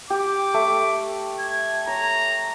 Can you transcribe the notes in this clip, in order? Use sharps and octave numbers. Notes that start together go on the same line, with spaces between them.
G4 D6
A3
G#6
C#5 A#5